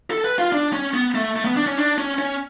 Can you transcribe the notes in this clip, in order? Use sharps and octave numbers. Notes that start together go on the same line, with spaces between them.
A4
B4
F4
D4
C#4
B3
A3
A3
B3
D4
C#4
D4
C#4
C#4